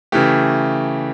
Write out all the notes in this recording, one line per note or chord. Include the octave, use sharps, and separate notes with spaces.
C#3 E3 A3 G4